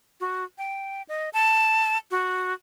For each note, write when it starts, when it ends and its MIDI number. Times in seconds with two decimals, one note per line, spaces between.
0.20 0.44 66
0.58 1.02 79
1.09 1.30 75
1.33 1.98 81
2.11 2.53 66